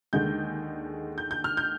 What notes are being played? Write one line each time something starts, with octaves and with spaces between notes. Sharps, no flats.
D#2 D3 G#3 G6
G6
G6
F6
G6